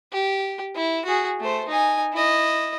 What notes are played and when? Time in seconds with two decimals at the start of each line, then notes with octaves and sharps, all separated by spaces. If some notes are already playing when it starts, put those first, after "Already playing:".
0.12 G4
0.76 E4
1.05 F#4 G#4
1.40 A3 C5
1.68 D#4 G#5
2.13 E4 D#5